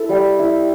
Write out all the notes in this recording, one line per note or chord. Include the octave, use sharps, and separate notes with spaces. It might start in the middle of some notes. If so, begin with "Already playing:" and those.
Already playing: E4 A4
G3
E4